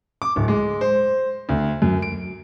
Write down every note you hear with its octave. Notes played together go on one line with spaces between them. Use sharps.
D6
D1
G#3
C5
D2
F#2
D7